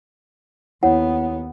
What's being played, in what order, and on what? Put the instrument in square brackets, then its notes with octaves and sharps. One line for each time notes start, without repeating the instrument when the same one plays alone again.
[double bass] D#2 B3 [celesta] E4 C#5 [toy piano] F#5